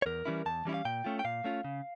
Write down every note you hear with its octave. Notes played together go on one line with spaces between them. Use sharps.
C#5
E2 A#4
E3 G3 C#4 E4
E2 A5
E3 G3 C#4 E4
F5
A#2 G5
A3 C#4 F4
G5
A#2 F5
A3 C#4 F4
C#3